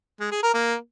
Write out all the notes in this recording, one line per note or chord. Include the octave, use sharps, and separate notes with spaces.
G#3
G#4
A#4
A#3